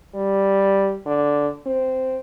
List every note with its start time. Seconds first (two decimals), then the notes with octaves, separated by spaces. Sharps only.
0.15 G3
1.07 D3
1.66 C4